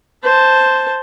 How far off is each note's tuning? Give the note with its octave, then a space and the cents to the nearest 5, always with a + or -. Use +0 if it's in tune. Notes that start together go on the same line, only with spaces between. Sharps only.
C5 +0 A5 +0